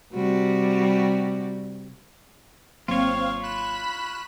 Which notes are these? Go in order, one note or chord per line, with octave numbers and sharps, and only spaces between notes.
C3 G3 F#4
G#1 F#3 A#3 C4 F4 C#5 F5
B5 F#6 E7